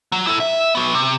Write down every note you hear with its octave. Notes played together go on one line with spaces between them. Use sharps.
F#3
E4 A4
E5
F#3 B3
C3